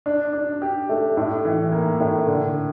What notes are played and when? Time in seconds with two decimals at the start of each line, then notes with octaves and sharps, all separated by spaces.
0.06 D4
0.33 D4
0.62 G4
0.89 A3
1.17 A2
1.45 E3
1.72 A#3
2.00 A2
2.27 D3